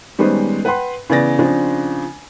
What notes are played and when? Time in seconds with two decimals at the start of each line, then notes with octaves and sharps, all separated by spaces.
0.18 D#3 G3 G#3 B3 C#4 C5
0.65 B4 F#5 G5 B5 C6
1.10 C#3 E3 B3 D5 A6 A#6
1.39 C#3 F3 C4 D4